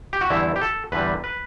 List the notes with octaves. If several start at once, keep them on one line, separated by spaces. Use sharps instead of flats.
G4
F#4
E2 D3 G3 E4
G4
A4
E2 D3 G3 B4
B4